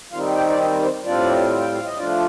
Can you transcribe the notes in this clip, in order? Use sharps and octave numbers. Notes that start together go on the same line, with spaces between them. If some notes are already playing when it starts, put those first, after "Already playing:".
D#3 G3 C4 D#4 F4 F5
G4 G5
D5
D#4 D#5
C4 C5
A2 G3 C4 D4 F4 D5
G5
F5
D#5
F3 A3 D4 F4 D5